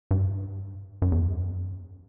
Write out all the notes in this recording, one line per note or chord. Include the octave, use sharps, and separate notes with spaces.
G2
F#2
E2
F#2